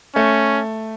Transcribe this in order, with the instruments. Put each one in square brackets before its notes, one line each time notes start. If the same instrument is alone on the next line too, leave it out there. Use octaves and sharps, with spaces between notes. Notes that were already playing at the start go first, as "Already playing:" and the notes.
[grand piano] A3 [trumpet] C#4